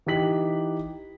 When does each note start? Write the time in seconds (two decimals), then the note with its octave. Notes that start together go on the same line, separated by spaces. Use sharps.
0.06 E3 D#4 G4 B6 F#7